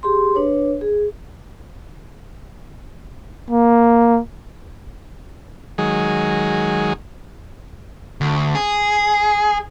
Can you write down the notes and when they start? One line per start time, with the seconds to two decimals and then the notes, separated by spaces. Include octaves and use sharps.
0.03 G4 G#4 C6
0.35 D4 B4 C#5
0.81 G#4
3.50 A#3
5.78 D#3 F#3 G#3 G#4
8.21 D2
8.55 G#4